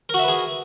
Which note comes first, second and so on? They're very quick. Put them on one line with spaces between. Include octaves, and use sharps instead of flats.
A#4 F#4 E5 B4 G#4